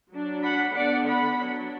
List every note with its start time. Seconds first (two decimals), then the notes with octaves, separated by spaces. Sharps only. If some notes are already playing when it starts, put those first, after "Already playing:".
0.12 F#3 D4
0.43 F#5 B5
0.75 D3 B3 D4 D5 F#5
1.07 F#5 B5
1.38 F#3 D4